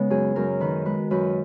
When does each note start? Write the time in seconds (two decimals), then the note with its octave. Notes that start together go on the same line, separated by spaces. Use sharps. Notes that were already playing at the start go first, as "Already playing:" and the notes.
Already playing: C#3 G#3 B3 C#4
0.10 F#2 G#4
0.36 F#2 A#4
0.60 D#3 B4
0.85 G#3 B4
1.11 F#2 B4